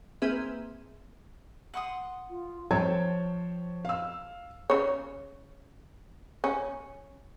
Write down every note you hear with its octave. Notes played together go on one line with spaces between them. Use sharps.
A#3 C4 G#4 B4 E5
F#5 C6 D#6
F4
F3 C5 C#5 G5 A5 G#6
F5 E6
C#3 C#5
C#4